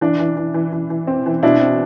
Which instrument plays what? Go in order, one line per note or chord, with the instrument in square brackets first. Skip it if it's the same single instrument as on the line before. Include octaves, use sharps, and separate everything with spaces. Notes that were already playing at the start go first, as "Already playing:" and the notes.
[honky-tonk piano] E3 [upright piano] D4
[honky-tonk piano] E3
E3
E3
E3
E3
C4
E3
[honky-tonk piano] B2 [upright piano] D4 E4
[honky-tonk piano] C4